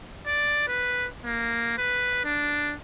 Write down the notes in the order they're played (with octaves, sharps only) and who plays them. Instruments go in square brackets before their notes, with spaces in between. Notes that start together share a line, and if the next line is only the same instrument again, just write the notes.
[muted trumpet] D5
B4
A#3
B4
D4